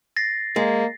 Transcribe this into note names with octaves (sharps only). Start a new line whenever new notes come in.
A6 A#6 C7
G#3 A#3